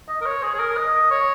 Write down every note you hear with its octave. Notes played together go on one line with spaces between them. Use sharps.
D#5
A#4
C#5
G#4
G#4
A#4
D#5
C#5